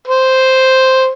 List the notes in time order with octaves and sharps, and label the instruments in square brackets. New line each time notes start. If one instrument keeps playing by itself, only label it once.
[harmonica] C5